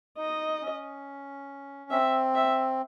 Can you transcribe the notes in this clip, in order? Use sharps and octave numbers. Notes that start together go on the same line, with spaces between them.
D#4 D#5
C#4
C4 E5
E5